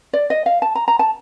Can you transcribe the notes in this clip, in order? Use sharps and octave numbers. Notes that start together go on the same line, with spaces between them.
D5
D#5
F5
A5
A#5
A#5
A5